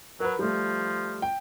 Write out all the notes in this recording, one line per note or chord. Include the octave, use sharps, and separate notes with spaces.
F#3 A#4 B4
F3 G3 A3
G5